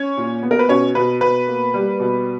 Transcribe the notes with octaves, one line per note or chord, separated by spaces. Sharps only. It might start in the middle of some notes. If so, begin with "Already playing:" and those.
Already playing: C#4 C#5
A#2
B3
A#4
B4
B2 C#4 C#5
B2 B4
B2 B4
A#3
G3
B2